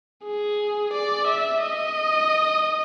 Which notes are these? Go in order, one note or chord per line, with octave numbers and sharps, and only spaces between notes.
G#4
D5
E5
D#5